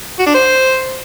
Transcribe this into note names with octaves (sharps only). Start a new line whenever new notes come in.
F#4
D4
C5